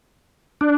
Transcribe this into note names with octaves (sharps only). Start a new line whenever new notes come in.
D4